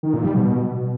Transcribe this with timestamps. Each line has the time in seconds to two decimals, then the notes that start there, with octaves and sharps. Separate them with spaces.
0.03 D#3
0.14 A#2
0.24 G3
0.35 B2